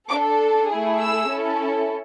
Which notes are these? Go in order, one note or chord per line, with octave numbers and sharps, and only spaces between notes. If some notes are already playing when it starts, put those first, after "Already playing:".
D4 A4 D6
A3 E4 G#4
E6
C#4 E4 A4